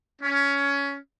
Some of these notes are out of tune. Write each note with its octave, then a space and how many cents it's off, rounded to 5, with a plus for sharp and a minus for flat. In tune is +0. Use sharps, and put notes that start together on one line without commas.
C#4 +15